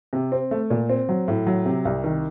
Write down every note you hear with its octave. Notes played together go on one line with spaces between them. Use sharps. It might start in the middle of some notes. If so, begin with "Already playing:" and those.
C3
C4
A3
A#2
C4
F#3
A2
F#3
C3
C2
D#3